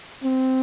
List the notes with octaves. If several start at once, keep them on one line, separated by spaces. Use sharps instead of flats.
C4